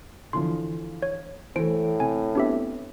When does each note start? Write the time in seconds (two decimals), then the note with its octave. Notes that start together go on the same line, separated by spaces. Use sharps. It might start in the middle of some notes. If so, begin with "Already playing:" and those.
0.33 D3 E3 F3 C6
1.02 C#5
1.56 A2 E3 A3 C5 D7
2.00 C3 G#5
2.35 B3 C4 D4 G4 E5